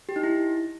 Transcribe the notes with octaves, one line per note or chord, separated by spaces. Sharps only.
G4
D#4
E4